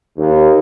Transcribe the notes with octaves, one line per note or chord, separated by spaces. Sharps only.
D#2